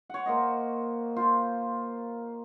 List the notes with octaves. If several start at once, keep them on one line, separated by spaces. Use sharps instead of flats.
C#5 F#5
A#3 C5 D#5
F4 C5